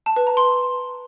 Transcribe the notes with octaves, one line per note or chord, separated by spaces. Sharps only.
A5
B4
A#5
C6